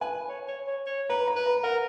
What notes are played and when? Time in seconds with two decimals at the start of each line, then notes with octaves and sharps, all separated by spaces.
0.01 B4 G#5
0.29 C#5
0.48 C#5
0.67 C#5
0.86 C#5
1.10 B4 A#5
1.27 A#5
1.36 B4
1.46 A#5
1.63 A#4 F#5